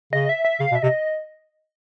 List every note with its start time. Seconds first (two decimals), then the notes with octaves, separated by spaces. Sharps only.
0.13 C#3 D#5
0.29 E5
0.45 E5
0.60 C#3 F5
0.71 B2
0.75 E5
0.83 C3 D#5